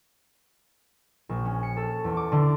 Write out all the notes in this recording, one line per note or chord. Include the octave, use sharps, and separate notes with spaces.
A#1
C#4
C#7
A4
E2
D6
D3